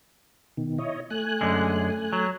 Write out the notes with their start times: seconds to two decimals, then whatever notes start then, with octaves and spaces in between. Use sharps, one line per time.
0.57 B2 D#3
0.78 E4 C#5 D#5
1.10 A3 G#5 F#6
1.41 F#2 D3 G#3
2.13 F#3